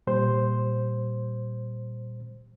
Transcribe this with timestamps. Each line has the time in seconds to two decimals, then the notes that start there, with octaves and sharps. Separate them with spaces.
0.07 A#2 G3 C5 G6